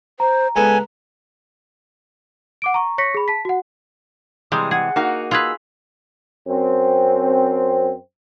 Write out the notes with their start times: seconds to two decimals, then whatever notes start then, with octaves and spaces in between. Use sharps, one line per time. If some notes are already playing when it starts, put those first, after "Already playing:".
0.20 C5 A#5
0.56 C#2 B3 A4 B4 G#5
2.62 F#5 D6 D7
2.74 A#5 C#6
2.98 C#5 C#6 A#6 B6 C#7
3.14 G#4 B5
3.28 A5 B6
3.45 F#4 F#5
4.52 C3 E3 G3 G#3 D#6
4.71 G#4 F#5
4.96 A#3 D#4 F#4
5.31 F4 G#4 B4 E6
6.47 F#2 C4